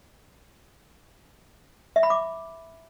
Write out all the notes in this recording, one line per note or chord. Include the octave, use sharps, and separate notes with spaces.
E5
B5
D6